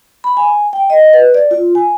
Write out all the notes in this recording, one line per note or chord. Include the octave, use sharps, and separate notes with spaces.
B5
G#5
G5
D#5
B4
D5
F4
G#5